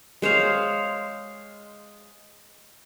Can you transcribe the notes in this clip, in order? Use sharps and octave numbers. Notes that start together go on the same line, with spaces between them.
G#3 C5 C#5 F5